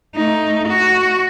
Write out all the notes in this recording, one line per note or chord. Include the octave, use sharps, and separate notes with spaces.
A3 D#4
F#4